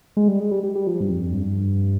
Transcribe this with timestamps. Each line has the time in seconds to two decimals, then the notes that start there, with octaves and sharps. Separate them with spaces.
0.17 G#3
0.28 G3
0.40 G#3
0.51 G3
0.63 G3
0.75 G3
0.87 F3
1.01 G2
1.11 F2
1.33 G2